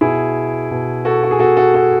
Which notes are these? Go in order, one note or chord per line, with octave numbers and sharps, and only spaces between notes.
B2 E4 G#4
B2
F#4 A4
F#4
G#4
B2 F#4 A4
F#4 A4
F#4 A4